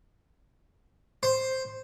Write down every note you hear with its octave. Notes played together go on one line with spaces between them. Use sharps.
C5